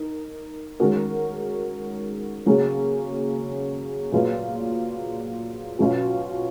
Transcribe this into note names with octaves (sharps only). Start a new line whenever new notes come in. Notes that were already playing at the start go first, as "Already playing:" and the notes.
Already playing: D#4 A#4
D#3 G#3 C#4 F#4 A#4
C#3 F#3 A#3 C#4 G#4
A#2 F#3 B3 F4 G#4
B2 F#3 C#4 F4